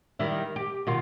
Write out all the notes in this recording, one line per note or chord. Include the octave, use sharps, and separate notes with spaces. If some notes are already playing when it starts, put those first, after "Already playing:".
D#3 G3 E4
G4
B2 D#3 F4